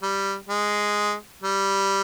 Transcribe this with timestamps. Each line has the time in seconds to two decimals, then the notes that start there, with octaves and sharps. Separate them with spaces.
0.03 G3
0.49 G#3
1.43 G3